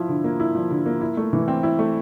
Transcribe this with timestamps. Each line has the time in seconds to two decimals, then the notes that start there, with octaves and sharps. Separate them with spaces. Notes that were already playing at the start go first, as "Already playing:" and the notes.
Already playing: F3 E4
0.09 D3
0.24 A#3
0.40 E4
0.55 F3
0.71 D3
0.86 A#3
1.01 E4
1.17 A3
1.33 E3
1.48 C4
1.63 E4
1.79 A3